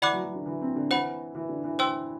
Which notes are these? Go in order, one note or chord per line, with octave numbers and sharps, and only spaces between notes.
E3 D5 F#5 B5 D6 F#6
F#3
F#3
D3
E3
C4
D3
E3 C5 F#5 B5
E3
D3
E3
C5 G5 C6 E6